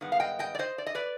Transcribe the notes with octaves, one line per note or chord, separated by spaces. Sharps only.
G2 D#3 G#3 B3
F5
D#5 G5
D#5 G5
D5
C5 D#5
D5
D#5
B4 D5